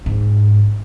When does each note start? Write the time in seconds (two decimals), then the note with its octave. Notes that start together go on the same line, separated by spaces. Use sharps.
0.06 G#2